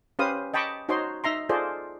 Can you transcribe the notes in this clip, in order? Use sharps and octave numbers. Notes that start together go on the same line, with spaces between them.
C#4 G4 B4 C5 F5 D#6
D#5 G5 A5 B5 C#6 D6
D#4 F#4 C5 C#5 D#5 C6
D#4 E5 A#5 C6
F4 G#4 A4 C5 D5 D#5